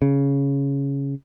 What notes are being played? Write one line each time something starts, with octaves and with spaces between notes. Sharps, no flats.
C#3